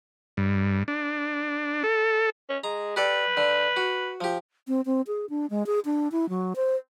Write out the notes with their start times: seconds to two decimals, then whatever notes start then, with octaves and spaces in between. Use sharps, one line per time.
0.37 G2
0.88 D4
1.84 A4
2.49 C#4
2.64 G#3 A#5
2.96 G4 A4 B4 D5
3.37 D3
3.77 F#4
4.21 F3 G4
4.68 C4
4.86 C4
5.07 G#4
5.30 D4
5.50 G#3
5.66 G#4
5.85 D4
6.12 E4
6.29 F#3
6.56 C5